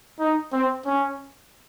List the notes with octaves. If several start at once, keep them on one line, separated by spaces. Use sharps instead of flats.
D#4
C4
C#4